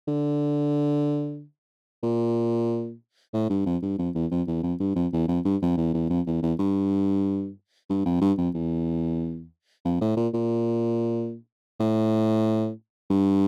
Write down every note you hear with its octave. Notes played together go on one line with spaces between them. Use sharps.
D3
A#2
A2
G2
F2
G2
F2
E2
F2
E2
F2
G2
F2
E2
F2
G2
F2
E2
E2
F2
E2
E2
G2
G2
F2
G2
F2
E2
F2
A2
A#2
A#2
A2
G2